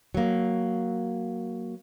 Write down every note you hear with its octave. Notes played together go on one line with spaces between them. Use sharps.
F#3 A#3